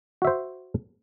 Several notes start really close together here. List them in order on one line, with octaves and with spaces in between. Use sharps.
F#4 E5 C5